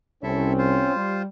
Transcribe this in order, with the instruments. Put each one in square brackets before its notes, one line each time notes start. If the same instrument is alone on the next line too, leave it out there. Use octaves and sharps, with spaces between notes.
[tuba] C2 [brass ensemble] C4 C#4 [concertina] E4 A4 E5
[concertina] F4 C5
[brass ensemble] G3